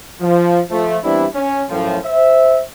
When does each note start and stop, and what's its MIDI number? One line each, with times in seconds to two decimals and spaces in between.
0.21 0.61 53
0.70 0.98 53
0.70 0.98 57
1.04 1.26 52
1.04 1.26 55
1.04 1.26 59
1.04 1.26 60
1.04 1.26 62
1.04 1.26 64
1.35 1.63 61
1.70 1.98 42
1.70 1.98 45
1.70 1.98 53
2.06 2.61 72
2.06 2.61 76